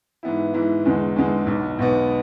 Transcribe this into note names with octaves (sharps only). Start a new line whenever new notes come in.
G#2 E3 B3 E4
G#2 E3 B3 E4
E2 D3 G#3
E2 D3 G#3
B1 B2 B3
B1 B2 B3